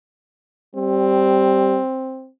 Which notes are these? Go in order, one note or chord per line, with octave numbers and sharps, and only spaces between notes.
G3 C4